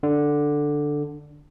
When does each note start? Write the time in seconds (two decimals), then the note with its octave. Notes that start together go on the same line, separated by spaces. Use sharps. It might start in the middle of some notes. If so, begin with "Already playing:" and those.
0.03 D3